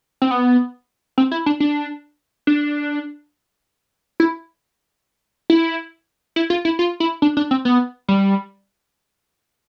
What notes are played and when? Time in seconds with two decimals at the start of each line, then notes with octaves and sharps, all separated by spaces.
0.22 C4
0.31 B3
1.18 C4
1.31 E4
1.46 D4
1.60 D4
2.47 D4
4.20 E4
5.50 E4
6.36 E4
6.50 F4
6.65 E4
6.79 F4
7.00 E4
7.22 D4
7.37 D4
7.51 C4
7.65 B3
8.08 G3